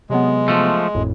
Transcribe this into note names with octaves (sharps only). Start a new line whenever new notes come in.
C3 F#3 G#3 B3
F3 A3
G#1 F2 A2